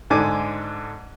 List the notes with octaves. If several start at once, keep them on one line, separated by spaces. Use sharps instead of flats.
G#2 D3 G#5 D6